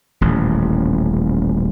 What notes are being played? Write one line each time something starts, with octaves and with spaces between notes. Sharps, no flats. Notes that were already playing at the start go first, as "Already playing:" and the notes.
D#1 A1